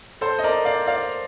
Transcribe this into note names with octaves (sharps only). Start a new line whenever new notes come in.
A4 C5
D#5
A#4 D5
D5 F5
D5 F5